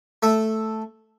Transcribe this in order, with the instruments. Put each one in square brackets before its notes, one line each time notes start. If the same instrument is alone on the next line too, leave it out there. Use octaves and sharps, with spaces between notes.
[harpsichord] A3 E5